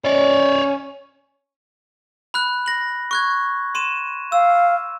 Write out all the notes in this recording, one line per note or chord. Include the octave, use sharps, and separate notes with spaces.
C#4 C#5 D5
B5 F6 F#6
A#6 F#7
C#6 F#6 G#6
C6 D#7 E7
F5 E6